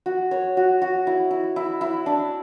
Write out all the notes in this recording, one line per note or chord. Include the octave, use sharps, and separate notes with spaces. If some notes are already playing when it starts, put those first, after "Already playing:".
F#4
C#5
F#4
F#4
E4
E4
E4
E4
D4